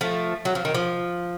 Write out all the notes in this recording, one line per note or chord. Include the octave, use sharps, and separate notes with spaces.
F3 A3
F#3
F3
D#3
F3